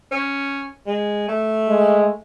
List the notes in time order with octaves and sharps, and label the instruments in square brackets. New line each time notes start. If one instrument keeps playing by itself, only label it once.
[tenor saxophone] C#4
G#3
A3
[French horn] G#3